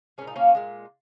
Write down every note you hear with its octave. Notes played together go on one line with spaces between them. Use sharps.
A#2 G#3 C#4
D#4
A#3 C#4
A#2 G#3